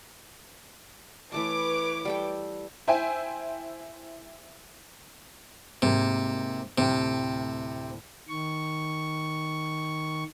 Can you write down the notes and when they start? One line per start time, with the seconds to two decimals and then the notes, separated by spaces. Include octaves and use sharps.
1.32 E3 A3 B4 C#5 A5 D6
2.05 G3 A4 G5
2.87 E4 C5 E5 G5 G#5
5.82 G#2 C3 A#3
6.78 D2 A2 C3 G5
8.28 D#3 C#6